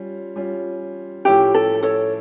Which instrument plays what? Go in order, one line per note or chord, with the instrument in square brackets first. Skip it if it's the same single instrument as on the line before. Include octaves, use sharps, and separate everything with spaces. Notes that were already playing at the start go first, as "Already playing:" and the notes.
Already playing: [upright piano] G3 C#4 F4
G3 C#4 F4
[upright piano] A2 F3 C#4 E4 [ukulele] G4
[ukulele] A4
A4 C#5